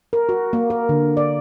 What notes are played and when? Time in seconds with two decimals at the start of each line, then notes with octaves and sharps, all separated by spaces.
0.13 A#4
0.29 F#4
0.53 A#3
0.70 A#4
0.89 D3
1.17 D5